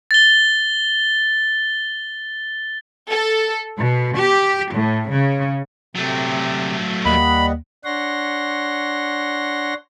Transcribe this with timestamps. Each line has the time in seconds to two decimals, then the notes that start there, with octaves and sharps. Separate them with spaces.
0.11 A6 G7
3.11 A4
3.77 B2
4.17 G4
4.73 A2
5.12 C#3
5.95 C3 F#3 A3
7.05 D#2 G3 A#3 D#5 F#5 B5
7.85 D4 C#5 F#5 C6 A#6